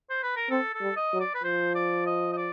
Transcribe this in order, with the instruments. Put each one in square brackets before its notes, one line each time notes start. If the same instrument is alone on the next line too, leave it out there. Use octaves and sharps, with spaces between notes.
[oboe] C5
B4
A#4
[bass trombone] C4 [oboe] A4
[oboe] A4
[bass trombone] G3
[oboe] D#5
[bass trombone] F#3
[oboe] D5
B4
[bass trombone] F3 [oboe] C5
[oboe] D5
D#5
D#5
D5